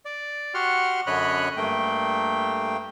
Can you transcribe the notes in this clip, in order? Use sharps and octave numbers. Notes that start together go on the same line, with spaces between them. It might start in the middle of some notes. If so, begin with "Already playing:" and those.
D5
F#4 G4 F#5 C6 F6
F#2 D3 C#5 D#5 B5 F#6
G2 A3 A#3 G5